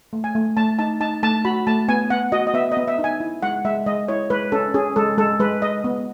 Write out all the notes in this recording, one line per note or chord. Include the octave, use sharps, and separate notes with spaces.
A3
G#5
A3
A3 A5
D#4 A5
D#4 A5
A3 A5
F#4 B5
A3 A5
B3 G#5
B3 F#5
F#4 D#5
D#5
B3 E5
D#5
B3
E5
D#4
G#5
E4
G#3 F#5
G#3 E5
G#3 D#5
E4 C#5
G#3 B4
C#4 A4
C#4 G#4
G#3 A4
G#3 A4
G#3 B4
G#3 D#5
B3